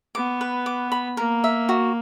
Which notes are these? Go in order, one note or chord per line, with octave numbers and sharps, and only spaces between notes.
B3 D6
B4
D6
B5
A#3 A#4
E5
F#4